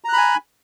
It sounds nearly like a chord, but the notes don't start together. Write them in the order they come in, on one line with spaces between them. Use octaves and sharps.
A#5 F#6 B5 G#5